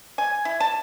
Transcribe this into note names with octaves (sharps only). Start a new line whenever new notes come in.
G#5
E4
A5